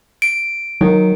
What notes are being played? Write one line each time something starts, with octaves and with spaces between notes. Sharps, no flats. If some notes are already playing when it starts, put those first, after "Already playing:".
D7
D#3 F#3